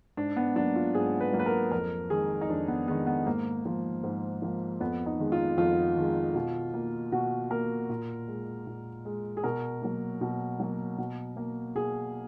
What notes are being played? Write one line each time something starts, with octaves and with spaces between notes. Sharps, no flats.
G#2 D4
B3
F#3 A#3 D4
F4
G#2 G#4
B4
F#3 A#3
B4
A#4
F2 A#4
D#3 G#3 G#4
D#4
F2 D4
B3
D#3 G#3 B3
B3
G#2 A#3
F3 A#3
G#2
F3 A#3
F2 B3
D#4
D#3 G#3
F4
F2 F4
D#3 G#3
B2
A#3
B2 F#4
A#3 A#4
A#2
G#3
A#2
G#3
G#4
B2 A#4
F#3 A#3
B2
F#3 A#3
B2
A#3
B2 G#4